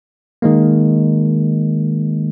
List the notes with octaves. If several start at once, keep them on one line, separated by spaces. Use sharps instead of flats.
D#3 G#3 A#3